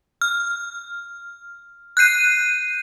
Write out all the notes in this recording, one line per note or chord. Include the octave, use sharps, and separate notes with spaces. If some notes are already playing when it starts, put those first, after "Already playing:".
F6
F#6 G6 C7 D#7